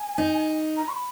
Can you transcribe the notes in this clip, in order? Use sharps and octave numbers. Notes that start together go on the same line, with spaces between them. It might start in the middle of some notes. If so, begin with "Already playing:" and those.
Already playing: G#5
D#4
A#5
C#6
B5